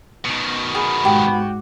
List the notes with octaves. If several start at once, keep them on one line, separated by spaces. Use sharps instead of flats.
B2 D#3
B3 G#4
G#2 F#4 G4